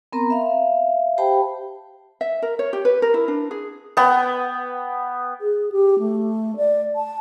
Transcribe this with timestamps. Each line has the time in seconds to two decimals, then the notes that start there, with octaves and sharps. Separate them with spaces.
0.12 B3 C4 A#4 A#5
0.30 E5 F5
1.18 G4 C5 G5 A5 B5
2.21 E5
2.42 A#4
2.59 C#5
2.73 G4
2.85 B4
3.02 A#4
3.14 E4
3.28 D4
3.51 G#4
3.97 B3 G5
5.40 G#4
5.72 G4
5.99 A3
6.56 D5
6.96 A5